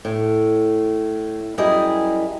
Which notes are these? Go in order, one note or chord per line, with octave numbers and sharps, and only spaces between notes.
A2
F#2 G3 E4 G4 G#4 D#5